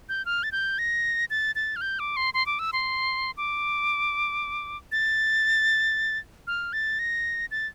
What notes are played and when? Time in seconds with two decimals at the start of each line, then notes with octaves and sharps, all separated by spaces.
0.09 G6
0.26 F6
0.43 A6
0.52 G6
0.78 A#6
1.30 A6
1.55 A6
1.76 F6
1.81 G6
1.99 D6
2.16 C6
2.34 C6
2.46 D6
2.59 E6
2.73 C6
3.37 D6
4.92 A6
6.47 F6
6.73 A6
6.99 A#6
7.51 A6